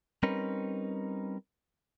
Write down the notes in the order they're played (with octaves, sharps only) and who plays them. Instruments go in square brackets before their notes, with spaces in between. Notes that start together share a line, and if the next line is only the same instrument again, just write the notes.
[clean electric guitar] G3 C4 C#4 D#4 A#4 B4